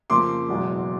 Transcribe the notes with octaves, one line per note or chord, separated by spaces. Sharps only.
F2 C#3 F3 A#3 C6 D6
F#1 E2 B2 G#3